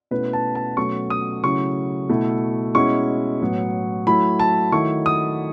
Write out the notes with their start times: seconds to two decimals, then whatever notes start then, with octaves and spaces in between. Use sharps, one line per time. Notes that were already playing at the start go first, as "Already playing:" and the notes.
0.11 B2 A3 C#4 E4 B4
0.33 A5
0.55 A5
0.77 B2 F#3 A3 C#4 C#6
1.10 D#6
1.43 C#3 F#3 A3 C#4 E4 C#6
2.09 B2 A3 E4
2.75 B2 G#3 C#4 E4 C#6
3.41 A2 F#3 B3
4.07 F#3 A3 E4 B5
4.39 A5
4.72 D#3 F#3 A3 E4 C#6
5.06 D#6